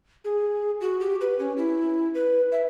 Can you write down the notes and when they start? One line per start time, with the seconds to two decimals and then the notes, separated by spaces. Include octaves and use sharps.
0.24 G#4
0.81 F#4
1.00 G4
1.21 B4
1.39 C#4
1.57 E4
2.15 B4
2.52 E5